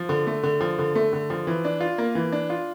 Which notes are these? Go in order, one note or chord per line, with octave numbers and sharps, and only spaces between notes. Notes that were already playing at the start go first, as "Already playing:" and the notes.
Already playing: F3
D3
A3
D3
F3
D3
A3
D3
F3
E3
D4
F4
A#3
E3
D4
F4